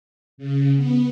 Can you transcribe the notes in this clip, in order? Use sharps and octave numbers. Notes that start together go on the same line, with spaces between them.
C#3
B3